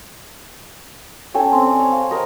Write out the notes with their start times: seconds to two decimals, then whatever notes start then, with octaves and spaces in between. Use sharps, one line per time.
1.34 C#4 A4 G5 G#5
1.52 C4 C6
1.66 D5
1.79 C#5
1.92 F5
2.11 A#4 C5 D#5